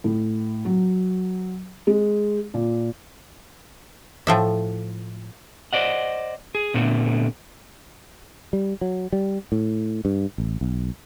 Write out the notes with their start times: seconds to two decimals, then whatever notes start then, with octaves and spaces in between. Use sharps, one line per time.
0.04 A2
0.65 F#3
1.87 G#3
2.54 A#2
4.27 A2 F3 E5
5.73 C5 D5 D#5 F#5
6.55 G#4
6.74 A#2 D3 A3 B3 C4
8.53 G3
8.81 F#3
9.13 G3
9.52 A2
10.05 G2
10.38 A1
10.61 B1